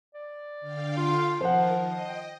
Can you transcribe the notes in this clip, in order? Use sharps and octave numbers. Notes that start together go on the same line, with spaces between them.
D5
D3 F5 G5
F4
D#3 F3 F4 A#4 C5 F#5
D#5
G5